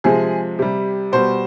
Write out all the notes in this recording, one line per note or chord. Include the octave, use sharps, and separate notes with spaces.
C3 F3 G#3 G#4
C3 G3
B2 G3 C5